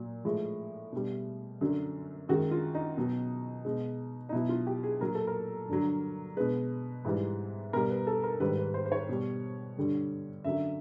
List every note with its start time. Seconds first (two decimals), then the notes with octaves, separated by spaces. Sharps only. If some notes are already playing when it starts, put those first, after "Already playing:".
Already playing: A#2 F#3
0.25 A2 F3 G#3
0.92 B2 G3
1.61 F#2 D3 F#3
2.29 F#2 D#3 G#3 F#4
2.51 F4
2.75 D#4
2.97 B2 F#3
3.65 B2 G#3
4.29 D#4
4.32 B2 F#3 E4
4.49 F4
4.67 G4
4.83 G#4
5.01 A#2 F#3 A#4
5.15 A4
5.27 A#4
5.68 G2 D3 F#3
6.37 B2 G#3 B4
7.05 G#2 E3 G3
7.73 B2 G3 A#4
7.90 B4
8.07 A4
8.24 A#4
8.40 G#2 D#3 G3 B4
8.57 B4
8.74 C5
8.86 C5
8.92 C#5
9.09 B2 G3
9.77 G2 D3 G3
10.44 F#2 D3 F#3 E5